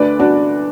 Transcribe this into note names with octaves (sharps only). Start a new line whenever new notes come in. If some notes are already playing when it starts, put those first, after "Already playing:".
Already playing: D2 D3 A3 B4 D5
D4 F#4